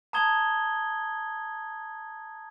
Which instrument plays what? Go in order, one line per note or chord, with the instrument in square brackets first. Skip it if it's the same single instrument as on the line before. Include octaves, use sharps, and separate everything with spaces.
[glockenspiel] A5 A#5 D#6 G#6 G7